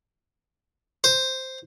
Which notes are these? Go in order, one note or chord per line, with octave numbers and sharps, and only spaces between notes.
C5